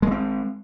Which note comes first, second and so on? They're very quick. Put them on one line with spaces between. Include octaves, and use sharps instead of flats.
G#3 B3 C4